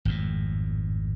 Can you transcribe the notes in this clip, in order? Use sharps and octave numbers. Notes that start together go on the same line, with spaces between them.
G#1 F2 A2